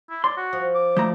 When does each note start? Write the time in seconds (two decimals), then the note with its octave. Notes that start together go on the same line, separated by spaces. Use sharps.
0.10 E4
0.24 C#5 D5 C6
0.37 F#4
0.53 F3
0.74 D6
0.97 D2 F3 A3 A#5